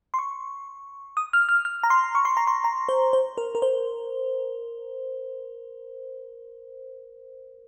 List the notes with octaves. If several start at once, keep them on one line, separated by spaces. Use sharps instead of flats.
C6
C#6
D#6
F6
F6
F6
A#5
C6
C#6
C6
A#5
C6
A#5
C5
C5
A#4
A#4
C5